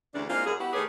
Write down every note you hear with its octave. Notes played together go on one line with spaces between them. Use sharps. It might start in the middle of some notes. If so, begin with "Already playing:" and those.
D2 C#3 E3 D4
G#3 A#3 C4 D4 E4 F4
F#2 G#4
B3 E4 F#4 G4
D#3 A3 G4 G#4 B4 C#5